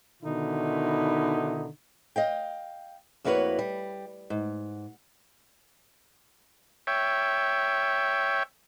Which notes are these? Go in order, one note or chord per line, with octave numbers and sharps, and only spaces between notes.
B2 D3 D#3 D#4 E4
D#5 F5 G5
F2 A#3 E4 F#4 B4 C#5
G3
G#2
C#5 E5 G5